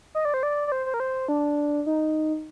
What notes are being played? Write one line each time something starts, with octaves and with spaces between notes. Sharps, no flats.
D#5
D5
C5
D5
D5
C5
C5
A#4
C5
D4
D#4